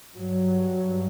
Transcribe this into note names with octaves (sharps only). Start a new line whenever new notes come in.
G2 F#3